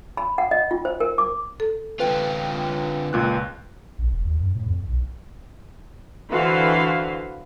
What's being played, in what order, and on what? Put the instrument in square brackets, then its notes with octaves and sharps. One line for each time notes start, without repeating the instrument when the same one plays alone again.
[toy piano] B5
F#5
D#5
F4
C5
A#4
D6
[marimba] A4
[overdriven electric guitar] D3 F4 [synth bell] B4 G5
[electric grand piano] C#2 A#2 F#6
[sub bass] A#1
E1
D#2
F#2
A2
F2
B1
[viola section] D3 E3 F#4 B4 C5 F5